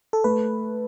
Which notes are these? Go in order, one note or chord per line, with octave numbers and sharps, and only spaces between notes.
A4
A3 B4